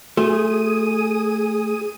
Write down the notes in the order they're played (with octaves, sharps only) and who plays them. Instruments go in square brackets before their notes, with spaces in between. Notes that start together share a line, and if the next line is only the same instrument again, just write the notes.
[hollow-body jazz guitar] A3 [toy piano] F#4 [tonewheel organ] G#4 D#6